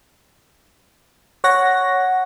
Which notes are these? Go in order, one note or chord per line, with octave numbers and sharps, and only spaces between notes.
C#5 F#5 A#6